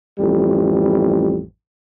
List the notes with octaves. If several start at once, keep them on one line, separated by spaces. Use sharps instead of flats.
A1 F2 G3